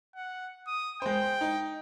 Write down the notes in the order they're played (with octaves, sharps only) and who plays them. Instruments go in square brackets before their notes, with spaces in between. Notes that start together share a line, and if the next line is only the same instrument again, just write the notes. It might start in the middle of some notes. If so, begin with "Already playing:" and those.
[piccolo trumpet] F#5
D#6
[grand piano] G#3 C5 [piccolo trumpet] G5
[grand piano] D#4